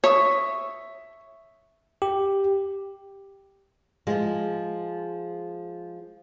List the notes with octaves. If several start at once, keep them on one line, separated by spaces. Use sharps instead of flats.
C#5 E5 C#6 D#6
G4
F3 G#3